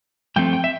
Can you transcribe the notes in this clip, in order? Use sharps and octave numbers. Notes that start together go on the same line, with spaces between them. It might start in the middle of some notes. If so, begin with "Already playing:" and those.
G2 F3 A3 C4 G5
G5
E5